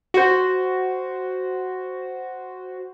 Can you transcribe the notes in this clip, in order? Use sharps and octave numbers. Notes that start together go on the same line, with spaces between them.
F#4 C5